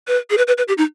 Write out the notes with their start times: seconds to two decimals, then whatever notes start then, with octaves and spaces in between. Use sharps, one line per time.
0.08 B4
0.30 G#4
0.38 B4
0.48 B4
0.58 B4
0.68 G4
0.78 D#4